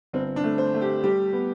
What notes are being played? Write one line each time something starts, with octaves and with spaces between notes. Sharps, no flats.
G1 C4
D4
A3
C5
A3
G4
G3 G4
B3